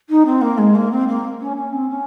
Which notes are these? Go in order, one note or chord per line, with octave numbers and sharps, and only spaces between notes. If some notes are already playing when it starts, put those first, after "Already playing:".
D#4
C4
A#3
G#3
A#3
C4
A#3
C#4
C#4
C4
C#4